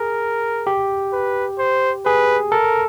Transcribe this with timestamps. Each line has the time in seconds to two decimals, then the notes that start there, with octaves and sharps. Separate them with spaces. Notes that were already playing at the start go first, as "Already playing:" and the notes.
Already playing: G#4 A#4
0.67 G4
1.13 B4
1.59 C5
2.06 G#4 B4
2.52 A4 A#4